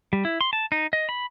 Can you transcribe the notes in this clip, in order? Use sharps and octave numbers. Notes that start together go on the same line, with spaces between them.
G3
E4
C6
A5
D#4
D#5
B5